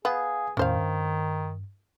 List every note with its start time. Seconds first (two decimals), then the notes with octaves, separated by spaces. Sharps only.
0.05 B3 G#4 F5 G#5
0.57 E2 A2 D#3 C#4 C5 F5
0.75 G2